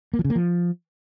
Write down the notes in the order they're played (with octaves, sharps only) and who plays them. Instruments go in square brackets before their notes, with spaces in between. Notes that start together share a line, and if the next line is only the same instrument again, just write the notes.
[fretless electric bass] A#3
F3
C#3
A#3
F3